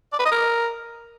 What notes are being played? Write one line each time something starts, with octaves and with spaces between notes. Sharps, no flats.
D5
B4
D#5
A#4